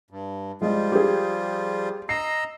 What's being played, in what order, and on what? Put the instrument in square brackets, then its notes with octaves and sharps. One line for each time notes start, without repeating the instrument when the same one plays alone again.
[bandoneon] G2
[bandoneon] F3 G3 F4 [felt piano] G#3
[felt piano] G4 G#4
[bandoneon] D#5 A#5 E6 [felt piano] C7